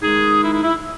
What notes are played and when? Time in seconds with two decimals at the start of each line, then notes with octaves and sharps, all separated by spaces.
0.02 D#3 G#3 D#4 G#4
0.43 E4
0.53 E4
0.63 E4